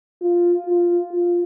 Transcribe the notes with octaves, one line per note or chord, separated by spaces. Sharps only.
F4
F4
F4